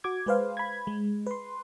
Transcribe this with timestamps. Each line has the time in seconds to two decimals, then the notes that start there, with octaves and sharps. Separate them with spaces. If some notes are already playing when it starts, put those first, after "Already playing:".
0.04 F#4 D6 G#6
0.26 G#3 G#4 B4 C5 F5
0.57 B5 G#6
0.87 G#3
1.27 B4 C6